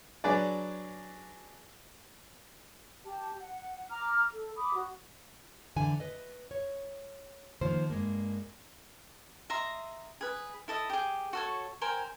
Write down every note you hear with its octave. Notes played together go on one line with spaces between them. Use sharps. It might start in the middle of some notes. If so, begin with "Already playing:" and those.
F#3 D4 G#4 B4 D5
G4 A5
F#5
A#5 D6 F6
A4
B5 D6 D#6
F#4
D3 E3 G#5
B4 D#5
C#5
D#3 F3 A#3 C5
G2 G#3 A#3
D#5 E5 A#5 C6
G#4 B4
E4 A4 D#5
G4 G#4
F#4 A4 C#5
A#4 C5 G5 G#5